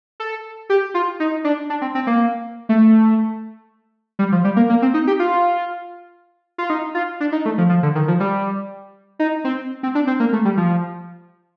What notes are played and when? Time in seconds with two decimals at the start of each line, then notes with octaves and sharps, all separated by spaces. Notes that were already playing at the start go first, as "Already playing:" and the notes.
0.20 A4
0.70 G4
0.94 F4
1.20 D#4
1.44 D4
1.70 D4
1.82 C4
1.95 C4
2.07 A#3
2.69 A3
4.19 G3
4.32 F3
4.44 G3
4.56 A#3
4.69 A#3
4.82 C4
4.94 D#4
5.07 G4
5.19 F4
6.58 F4
6.70 D#4
6.95 F4
7.20 D4
7.32 D#4
7.45 A3
7.58 F3
7.69 F3
7.83 D3
7.95 D#3
8.08 F3
8.20 G3
9.19 D#4
9.44 C4
9.83 C4
9.95 D4
10.07 C4
10.20 A#3
10.33 A3
10.45 G3
10.57 F3